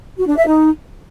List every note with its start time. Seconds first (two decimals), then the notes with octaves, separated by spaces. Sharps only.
0.18 F#4
0.27 D4
0.37 E5
0.47 D#4